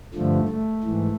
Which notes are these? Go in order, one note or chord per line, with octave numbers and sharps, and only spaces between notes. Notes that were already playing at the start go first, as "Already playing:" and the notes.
G2 D3 F3 A3
A3
G#2 E3